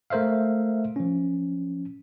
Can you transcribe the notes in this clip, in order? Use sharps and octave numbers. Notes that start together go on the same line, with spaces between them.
A3 A#4 C5 E5 F5
F3 C#4